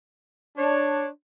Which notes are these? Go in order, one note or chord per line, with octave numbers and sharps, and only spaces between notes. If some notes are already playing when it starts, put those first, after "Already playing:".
D4 C#5